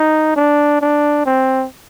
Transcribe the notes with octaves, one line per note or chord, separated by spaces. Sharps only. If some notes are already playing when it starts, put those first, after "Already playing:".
Already playing: D#4
D4
D4
C4